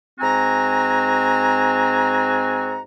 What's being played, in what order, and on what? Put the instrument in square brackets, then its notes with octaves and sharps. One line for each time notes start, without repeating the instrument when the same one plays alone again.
[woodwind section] G#2 C4 F#4 G#5 A#5